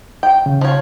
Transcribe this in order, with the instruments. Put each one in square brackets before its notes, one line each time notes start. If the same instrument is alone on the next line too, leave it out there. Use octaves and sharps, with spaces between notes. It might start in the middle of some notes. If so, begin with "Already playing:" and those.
[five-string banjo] G5
[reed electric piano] C#3
[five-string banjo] F3 C#5